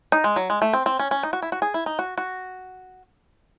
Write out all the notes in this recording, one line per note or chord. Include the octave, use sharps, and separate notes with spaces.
D#4
G#3
F#3
G#3
A3
C4
C4
C#4
C#4
D#4
F#4
E4
F#4
G#4
E4
D#4
F#4
F#4